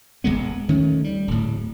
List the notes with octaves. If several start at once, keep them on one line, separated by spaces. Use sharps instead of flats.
E1 G#2 G#3 B3
D2 D#3 A3 C#4
G3
D1 A2